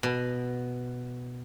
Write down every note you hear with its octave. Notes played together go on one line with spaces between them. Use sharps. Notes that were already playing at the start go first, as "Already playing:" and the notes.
B2